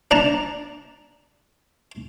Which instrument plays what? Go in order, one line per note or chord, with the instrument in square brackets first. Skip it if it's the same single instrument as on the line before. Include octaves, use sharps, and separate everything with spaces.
[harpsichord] D4 A5 A#5